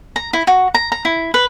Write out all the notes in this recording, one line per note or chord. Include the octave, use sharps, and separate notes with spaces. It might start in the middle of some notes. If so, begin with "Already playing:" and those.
A#5
E4
F#4
A#5
A#5
E4
B4